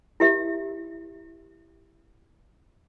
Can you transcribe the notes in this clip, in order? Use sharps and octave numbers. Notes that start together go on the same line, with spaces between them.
E4 G4 E5